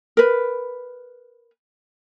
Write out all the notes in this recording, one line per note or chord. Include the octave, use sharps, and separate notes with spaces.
A#4 B4